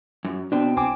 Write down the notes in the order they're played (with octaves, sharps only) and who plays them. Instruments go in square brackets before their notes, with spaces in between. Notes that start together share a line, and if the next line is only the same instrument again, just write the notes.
[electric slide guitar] F#2
[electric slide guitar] B2 C4 [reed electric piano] D4
[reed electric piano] C2 G#5 D6 [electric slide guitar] C4